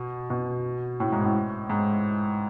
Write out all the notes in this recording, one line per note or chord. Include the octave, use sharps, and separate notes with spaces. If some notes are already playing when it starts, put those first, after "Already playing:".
Already playing: B2
B2
A2
G#2
A2
G#2